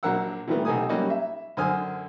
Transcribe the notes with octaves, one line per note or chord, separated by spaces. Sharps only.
A#1 F#3 D4 A#4 F#5 E6
A#2 D#3 E3 G3 A3 B3
B1 C3 D#4 A4 G#5 D#6
F#3 G3 A#3 C#4 D#4 F#4
E5
F#2 D3 C5 G#5 D#6 F6